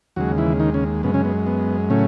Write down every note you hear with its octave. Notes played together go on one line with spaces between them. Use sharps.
D#2 C#3 F#3 G#3 F#4
E3 E4
D#3 D#4
C#3 C#4
F#2 C#3 G#3 B3
C#3 C#4
B3
B3
A2 C#3 F#3 A3 C#4